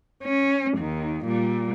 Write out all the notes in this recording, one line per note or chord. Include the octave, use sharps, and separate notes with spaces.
C#4
D#2 D#3
A#2 G3